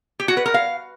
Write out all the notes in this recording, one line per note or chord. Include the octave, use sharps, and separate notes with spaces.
G4
F#4
B4
A#4
F5